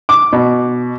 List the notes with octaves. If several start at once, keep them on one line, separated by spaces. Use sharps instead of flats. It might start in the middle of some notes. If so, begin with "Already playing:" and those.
D6
B2